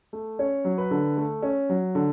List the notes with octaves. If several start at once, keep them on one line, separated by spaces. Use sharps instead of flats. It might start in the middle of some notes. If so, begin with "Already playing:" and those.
A3
C#4 C#5
F#3
B4
D3
A3
C#4
F#3
D3